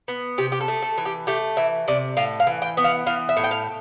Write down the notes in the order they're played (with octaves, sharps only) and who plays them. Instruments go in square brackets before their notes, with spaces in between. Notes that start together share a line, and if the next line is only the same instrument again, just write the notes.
[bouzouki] B3
C3 G4
G4
A4
A3
A4
E3
G4
A3 G4
E3 E5
C3 D5
A2 F5
F5
E3
G5
B3
F5
E3 F5
E5
A2
G5
F5